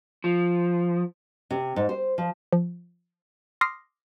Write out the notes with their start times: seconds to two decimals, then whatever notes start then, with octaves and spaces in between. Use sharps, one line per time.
0.24 F3
1.51 C3
1.76 G#2
1.89 C5
2.18 F3
2.53 F3
3.61 C6 D6 D#6 F6 A#6 C7